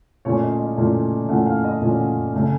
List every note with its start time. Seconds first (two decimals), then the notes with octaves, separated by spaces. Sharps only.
0.25 A#2 A3 C#4 C#5
0.43 D#5
0.59 D#5
0.78 A#2 A3 C#4
1.29 A#2 A3 C#4 F#5
1.46 F5
1.64 D#5
1.82 A#2 A3 C#4
2.34 C#3 A3 C#4